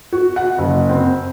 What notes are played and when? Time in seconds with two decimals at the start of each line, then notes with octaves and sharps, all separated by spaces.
0.12 F#4
0.36 F#5
0.58 F#1
0.89 C4